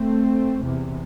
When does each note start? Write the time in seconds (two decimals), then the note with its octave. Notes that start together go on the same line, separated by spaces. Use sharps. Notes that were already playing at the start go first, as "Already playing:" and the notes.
Already playing: A3 C4
0.63 E2 C3